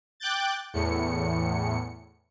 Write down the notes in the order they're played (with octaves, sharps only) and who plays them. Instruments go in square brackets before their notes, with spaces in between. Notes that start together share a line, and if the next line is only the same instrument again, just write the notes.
[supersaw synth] G5 D6 F#6 G6 A6
E2 A2 C#7